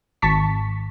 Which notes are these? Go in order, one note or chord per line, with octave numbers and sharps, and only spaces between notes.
G#1 A5 C#6 B6